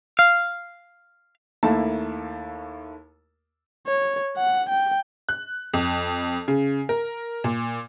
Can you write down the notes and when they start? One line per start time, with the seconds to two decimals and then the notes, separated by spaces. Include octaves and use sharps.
0.19 F5
1.63 D#2 A3 A#3 E4 A5
3.87 C#5
4.37 F#5
4.69 G5
5.29 F#6
5.74 F2
6.48 C#3
6.89 A#4
7.44 A#2